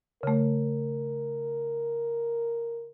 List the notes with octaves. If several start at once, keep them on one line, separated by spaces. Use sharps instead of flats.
C#3 A3 A#4